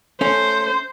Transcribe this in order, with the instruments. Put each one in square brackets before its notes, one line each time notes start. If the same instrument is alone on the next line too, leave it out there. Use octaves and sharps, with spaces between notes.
[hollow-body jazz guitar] A3 C#4 [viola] C5